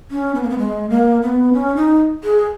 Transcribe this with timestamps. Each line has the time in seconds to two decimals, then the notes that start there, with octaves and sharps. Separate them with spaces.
0.11 C#4
0.35 B3
0.43 A#3
0.50 B3
0.58 G#3
0.90 A#3
1.22 B3
1.54 C#4
1.76 D#4
2.24 G#4